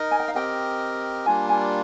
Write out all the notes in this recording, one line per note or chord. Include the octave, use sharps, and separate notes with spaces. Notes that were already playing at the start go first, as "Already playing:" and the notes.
Already playing: D#4 A#4 D#5
G#5
G5
F5
C4 G4 A#4 D#5 G5
G3 A#3 D4 F4 G#5
G#5